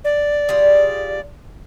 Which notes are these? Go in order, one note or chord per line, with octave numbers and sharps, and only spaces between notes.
D5
G3 F4 G#4